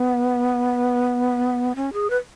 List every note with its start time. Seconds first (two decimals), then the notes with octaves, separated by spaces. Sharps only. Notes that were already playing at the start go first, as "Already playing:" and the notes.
Already playing: B3
1.76 C#4
1.93 G#4
2.10 B4